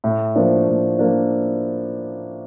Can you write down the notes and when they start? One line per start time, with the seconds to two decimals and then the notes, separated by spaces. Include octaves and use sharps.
0.04 A2
0.36 F3 A#3 D4
0.68 A2
0.99 F3 A#3 D4